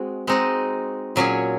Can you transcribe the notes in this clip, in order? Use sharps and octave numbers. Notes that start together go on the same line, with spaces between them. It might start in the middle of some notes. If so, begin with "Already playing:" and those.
Already playing: G#3 C4 F#4
G#3 C4 D#4 F#4
A#2 F#3 C#4 G#4